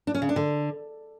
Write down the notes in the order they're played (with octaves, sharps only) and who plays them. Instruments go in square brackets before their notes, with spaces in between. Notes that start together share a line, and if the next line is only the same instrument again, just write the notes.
[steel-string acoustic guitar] D4
C#4
C#3
D4
D3